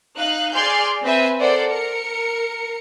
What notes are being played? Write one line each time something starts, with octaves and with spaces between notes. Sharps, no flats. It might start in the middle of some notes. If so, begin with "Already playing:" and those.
D#4 F5 F#6
G#4 D5 G#5 C6 F6 G6
C4 B4 C5 E5 G#5
A4 A#4 C5 D5 F#5
A#4 C#7